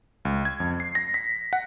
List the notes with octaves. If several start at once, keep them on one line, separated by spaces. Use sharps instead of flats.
C#2
G#6
F2
C7
A#6
B6
F#5